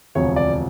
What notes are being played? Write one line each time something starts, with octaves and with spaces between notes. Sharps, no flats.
E1 D2 C3 F3 C#5
D5